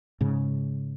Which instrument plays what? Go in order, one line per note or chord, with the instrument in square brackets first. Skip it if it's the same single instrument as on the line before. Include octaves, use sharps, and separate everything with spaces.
[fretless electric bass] G#2 C#3